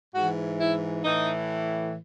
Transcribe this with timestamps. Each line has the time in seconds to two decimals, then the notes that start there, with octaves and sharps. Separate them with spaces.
0.15 G#2 E3 F#4
0.60 E4
1.05 A2 E3 D#4